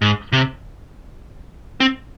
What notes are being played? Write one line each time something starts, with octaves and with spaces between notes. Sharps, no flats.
G#2
C3
C4